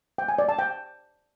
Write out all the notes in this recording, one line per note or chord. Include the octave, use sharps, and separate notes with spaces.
G5
G#5
D5
A5
G5